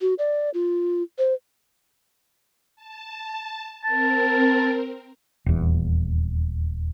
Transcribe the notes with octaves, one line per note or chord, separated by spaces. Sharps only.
F#4
D5
F4
C5
A5
C4 A#4 A5
D#1 E2